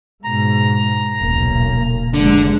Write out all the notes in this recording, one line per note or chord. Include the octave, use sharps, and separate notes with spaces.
G#2 B2 A#5
D#1 B1 C#3 A#3
F1 D3 G#3